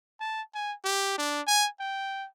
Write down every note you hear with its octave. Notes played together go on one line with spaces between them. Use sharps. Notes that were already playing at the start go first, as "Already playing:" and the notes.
A5
G#5
G4
D4
G#5
G5